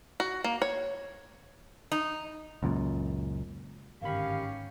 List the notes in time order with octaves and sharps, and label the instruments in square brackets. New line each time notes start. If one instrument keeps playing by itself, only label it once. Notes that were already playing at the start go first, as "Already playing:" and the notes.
[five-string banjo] F#4
A#3
C#5
[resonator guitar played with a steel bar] D#4
[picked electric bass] C#2 F#2 A#2
[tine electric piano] G1 D#3 B5 [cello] G#2 C#4 [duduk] G4 [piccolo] F5